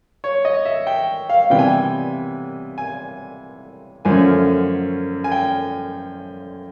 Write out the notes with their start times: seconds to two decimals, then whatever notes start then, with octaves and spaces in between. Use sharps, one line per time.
0.24 C#5
0.45 D#5
0.65 E5
0.87 G5
1.29 F5
1.50 C3 E3 G3 B3 G5
1.59 G#5
1.68 G5
2.78 G#5
4.05 F#2 D3 F3 A3 C#4 G#5
5.24 G#5
5.32 G5